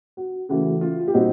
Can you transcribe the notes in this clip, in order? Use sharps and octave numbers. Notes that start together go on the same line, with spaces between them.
F#4
C#3 E3 A3 F#4
F4
G4
A#2 G3 C4 D#4 F#4